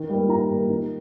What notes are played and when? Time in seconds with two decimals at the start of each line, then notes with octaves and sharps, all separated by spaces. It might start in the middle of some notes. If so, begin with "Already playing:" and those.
Already playing: D#3
0.09 G3 A#3
0.28 D#3 A#5
0.49 G3 A#3
0.70 D#3